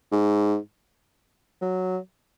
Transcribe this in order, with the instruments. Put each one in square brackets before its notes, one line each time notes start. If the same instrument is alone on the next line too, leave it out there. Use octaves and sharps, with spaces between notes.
[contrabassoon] G#2
F#3